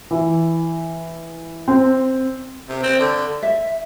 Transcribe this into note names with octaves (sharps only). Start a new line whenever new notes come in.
E3
C4
C3
C4
D3
E5